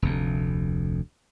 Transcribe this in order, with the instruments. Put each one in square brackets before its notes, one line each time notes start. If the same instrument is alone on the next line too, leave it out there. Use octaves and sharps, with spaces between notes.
[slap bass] F1 D2